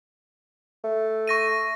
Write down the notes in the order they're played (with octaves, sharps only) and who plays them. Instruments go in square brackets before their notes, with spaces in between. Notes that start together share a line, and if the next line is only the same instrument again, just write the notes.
[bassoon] A3
[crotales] C#6 A#6 D#7